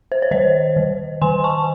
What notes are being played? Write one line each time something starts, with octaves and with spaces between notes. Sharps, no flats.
C5
C#5
D#3 C5 D#5
D#3
D#3 G#5 C6
A5 C#6